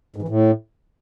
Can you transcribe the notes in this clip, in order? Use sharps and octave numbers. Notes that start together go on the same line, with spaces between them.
G#2
E3
A2